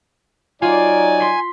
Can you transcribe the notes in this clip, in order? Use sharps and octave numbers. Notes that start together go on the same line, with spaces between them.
F#3 D#4 F4 D5 G#5
C6 B6